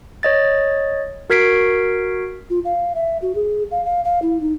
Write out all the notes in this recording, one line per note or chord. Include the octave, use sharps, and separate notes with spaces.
C#5 D#5 A6
F#4 A#4 G#6 B6 C7 D7
F4
F5
E5
F#4
G#4
F5
F5
F5
E4
D#4